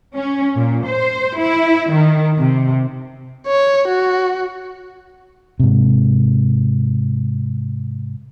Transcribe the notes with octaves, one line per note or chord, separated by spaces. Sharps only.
C#4
A#2
C5
E4
D#3
C3
C#5
F#4
G#2 C3